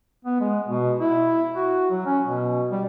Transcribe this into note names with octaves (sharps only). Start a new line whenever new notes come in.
B3
G#3
B2
E4
F#4
F#3
C#4
B2
G3